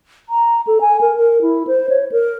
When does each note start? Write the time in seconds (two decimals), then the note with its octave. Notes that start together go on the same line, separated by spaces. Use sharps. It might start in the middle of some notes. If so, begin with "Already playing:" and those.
0.29 A#5
0.67 A4
0.81 G#5
1.01 A#4
1.17 A#4
1.42 E4
1.67 C5
1.89 C#5
2.12 A#4